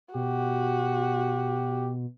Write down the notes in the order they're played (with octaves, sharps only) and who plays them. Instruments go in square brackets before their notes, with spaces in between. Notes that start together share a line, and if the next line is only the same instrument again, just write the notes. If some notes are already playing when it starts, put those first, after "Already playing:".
[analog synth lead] B2 [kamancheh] F#4 [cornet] G4